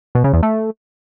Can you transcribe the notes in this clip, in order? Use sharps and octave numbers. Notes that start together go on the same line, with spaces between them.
B2
C#3
E2
A3